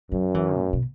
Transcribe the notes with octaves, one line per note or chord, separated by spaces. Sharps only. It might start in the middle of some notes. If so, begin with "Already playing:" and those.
F#2 F#3
E3
A2
B2